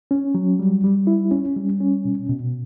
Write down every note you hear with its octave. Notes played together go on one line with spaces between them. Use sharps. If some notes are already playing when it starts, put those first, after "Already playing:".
C#4
F#3
G3
G3
E4
C#4
G3
C#4
B2
B2